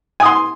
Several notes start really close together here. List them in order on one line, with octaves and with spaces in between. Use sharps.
G#5 D#6 C6